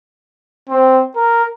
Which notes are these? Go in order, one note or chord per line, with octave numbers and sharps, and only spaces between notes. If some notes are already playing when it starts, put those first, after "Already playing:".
C4
A#4